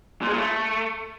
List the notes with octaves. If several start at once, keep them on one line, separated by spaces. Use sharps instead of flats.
A#2
G#3
A#2
A3